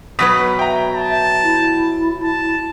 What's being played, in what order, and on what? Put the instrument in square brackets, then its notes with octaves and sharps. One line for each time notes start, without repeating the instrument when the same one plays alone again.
[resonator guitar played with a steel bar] B2 F#3 B4 [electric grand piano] D#6 B6
[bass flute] E5 [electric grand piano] G5 A#5
[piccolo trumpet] A5
[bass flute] E4
[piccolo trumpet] A5